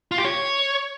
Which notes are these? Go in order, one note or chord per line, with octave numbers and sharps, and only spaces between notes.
F4
G4
C#5